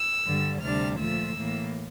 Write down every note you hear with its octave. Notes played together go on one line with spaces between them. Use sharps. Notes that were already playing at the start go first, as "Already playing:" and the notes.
Already playing: E6
G2 D3 G3
D2 C3 G3 D4 F6
A#2 F3 A3 E6
A2 E3 A#3